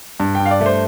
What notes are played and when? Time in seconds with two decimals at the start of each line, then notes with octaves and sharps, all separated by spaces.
0.20 G2
0.35 G5
0.40 G2
0.46 F5
0.51 D5
0.61 A3
0.66 C5